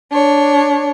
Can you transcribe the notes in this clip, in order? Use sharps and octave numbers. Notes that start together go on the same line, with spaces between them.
D4 C#5